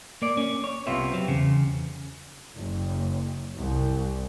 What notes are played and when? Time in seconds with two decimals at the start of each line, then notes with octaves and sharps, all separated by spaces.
0.22 A#3 D5
0.37 C#4
0.64 C#5
0.87 C2 C3 B3 F4 E5
1.11 F#3 C4
1.28 E2 C#3
2.57 F#1
3.58 C2